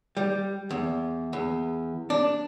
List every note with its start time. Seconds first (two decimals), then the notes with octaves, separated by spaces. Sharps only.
0.17 G3
0.70 E2
1.33 E2
2.10 D4